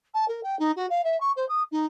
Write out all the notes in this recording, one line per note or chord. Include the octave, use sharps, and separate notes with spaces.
A5
A#4
G5
D#4
F#4
F5
E5
C#6
C5
D#6
D#4